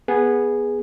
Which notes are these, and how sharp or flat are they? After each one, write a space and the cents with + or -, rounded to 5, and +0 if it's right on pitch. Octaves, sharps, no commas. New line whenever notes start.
B3 -10 G#4 +0